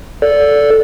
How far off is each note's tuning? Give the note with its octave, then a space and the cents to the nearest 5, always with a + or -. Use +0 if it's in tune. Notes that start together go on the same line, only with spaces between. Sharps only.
A4 +0 D5 -20